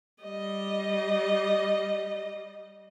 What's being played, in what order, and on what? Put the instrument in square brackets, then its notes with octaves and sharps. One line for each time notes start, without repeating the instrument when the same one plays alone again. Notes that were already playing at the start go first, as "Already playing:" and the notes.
[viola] G3 D#5